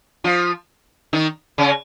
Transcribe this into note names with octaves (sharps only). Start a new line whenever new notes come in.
F3 F4
D#3 D#4
C#3 C#4